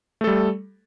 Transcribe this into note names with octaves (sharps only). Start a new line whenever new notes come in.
G3 A3 A4